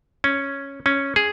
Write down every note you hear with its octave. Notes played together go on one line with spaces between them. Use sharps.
C#4
C#4
G#4